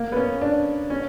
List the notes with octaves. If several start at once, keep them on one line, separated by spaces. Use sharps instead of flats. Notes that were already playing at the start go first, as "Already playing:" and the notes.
Already playing: A#3
B3
C#4
D4
C#4